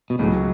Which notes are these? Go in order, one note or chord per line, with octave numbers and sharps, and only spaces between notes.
B2
C#2 A2 C#3 F#3